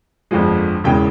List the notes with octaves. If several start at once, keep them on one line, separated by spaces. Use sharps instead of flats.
G1 F2 D3 F3 G#3
E1 E2 C#3 E3 G#3 G5